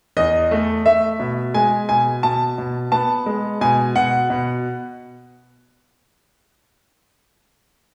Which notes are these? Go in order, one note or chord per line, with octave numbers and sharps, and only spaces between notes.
E2 D#5
A3
A3 E5
B2
G#3 G#5
B2 G#5
B2 A5
B2
B3 A5
G#3
B2 G#5
B2 F#5
B2